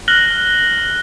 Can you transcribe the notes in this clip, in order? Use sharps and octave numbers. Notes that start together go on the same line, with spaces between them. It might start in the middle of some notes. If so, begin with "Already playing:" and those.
F6 F#6 A#6 F#7 G7